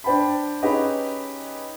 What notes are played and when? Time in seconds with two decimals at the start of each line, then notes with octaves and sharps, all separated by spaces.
0.04 D4 C5 G5 A5 B5
0.62 C#4 D#4 G4 G#4 B4 D#5